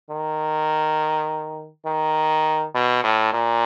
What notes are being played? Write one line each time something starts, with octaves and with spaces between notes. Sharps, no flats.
D#3
D#3
B2
A2
A#2